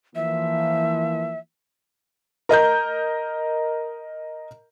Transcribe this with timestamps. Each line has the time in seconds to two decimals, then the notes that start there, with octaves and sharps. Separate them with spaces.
0.16 E3 F3 A#3 E5
2.49 A#4 D#5 A#5 G6